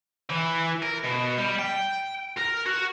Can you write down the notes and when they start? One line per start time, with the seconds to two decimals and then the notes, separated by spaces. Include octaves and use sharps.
0.30 E3
0.83 A#4
1.04 B2
1.38 G3
1.59 G5
2.37 A#4
2.66 F#4